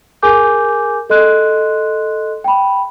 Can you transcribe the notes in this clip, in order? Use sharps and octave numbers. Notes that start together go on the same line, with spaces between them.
G#4 A#4 G#5 D6 G6
A4 D#5 C6 F#6
G5 B5